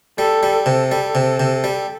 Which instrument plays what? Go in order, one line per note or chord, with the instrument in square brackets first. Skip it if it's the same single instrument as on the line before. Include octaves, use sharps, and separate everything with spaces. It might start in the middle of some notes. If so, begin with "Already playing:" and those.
[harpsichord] G3 [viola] A4
[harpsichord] G3
[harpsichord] C3 [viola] A4
[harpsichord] G3
C3
C3
G3